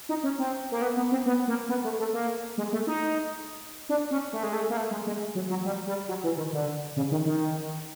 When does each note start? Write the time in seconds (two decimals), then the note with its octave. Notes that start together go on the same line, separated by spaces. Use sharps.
0.09 D#4
0.23 C#4
0.39 C4
0.71 A#3
0.82 B3
0.97 B3
1.12 C4
1.26 B3
1.48 A#3
1.69 B3
1.84 A3
1.99 A3
2.13 A#3
2.58 G#3
2.72 A3
2.87 D#4
3.89 D4
4.11 C#4
4.33 A3
4.43 G#3
4.53 A3
4.70 A#3
4.77 A3
4.91 G#3
5.07 G#3
5.35 F#3
5.50 F#3
5.65 G3
5.87 G3
6.08 F#3
6.23 E3
6.37 D#3
6.53 D3
6.96 C#3
7.11 D#3
7.26 D#3